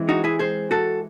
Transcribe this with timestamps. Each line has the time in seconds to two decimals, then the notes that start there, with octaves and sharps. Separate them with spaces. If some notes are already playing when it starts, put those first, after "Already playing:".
Already playing: E3 G#3 C4
0.09 D#4 F#4
0.24 E4 G#4
0.39 G#4 C5
0.71 F#4 A4